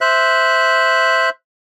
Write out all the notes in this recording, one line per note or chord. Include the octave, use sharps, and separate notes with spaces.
C5 E5 F#6